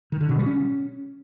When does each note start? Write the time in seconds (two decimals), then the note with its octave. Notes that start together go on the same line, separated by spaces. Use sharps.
0.12 D#3
0.21 D3
0.29 B2
0.38 G3
0.46 C#4